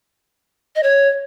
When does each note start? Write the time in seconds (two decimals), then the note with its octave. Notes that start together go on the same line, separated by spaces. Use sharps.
0.76 D#5
0.83 C#5